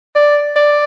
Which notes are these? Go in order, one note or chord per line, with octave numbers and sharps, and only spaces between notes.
D5
D5